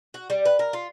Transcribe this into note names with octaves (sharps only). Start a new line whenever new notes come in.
F#4
G3
B4
A#4
F4